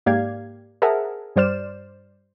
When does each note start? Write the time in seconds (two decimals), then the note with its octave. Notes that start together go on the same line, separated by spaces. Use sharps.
0.06 G#2 A#3 G4 D5 F5 G#6
0.82 G#4 A#4 C5 E5 F#5 A5
1.36 G2 G3 C5 D5 F6 E7